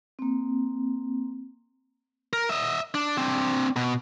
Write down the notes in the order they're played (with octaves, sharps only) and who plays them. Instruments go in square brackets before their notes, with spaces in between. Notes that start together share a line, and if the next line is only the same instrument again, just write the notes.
[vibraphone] A#3 C4
[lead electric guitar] A#4
D#5 E5
D4
C4 D4
B2